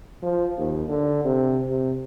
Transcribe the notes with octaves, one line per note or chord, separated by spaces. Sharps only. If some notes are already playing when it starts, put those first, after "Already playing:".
F3
D#2
D3
C3
C3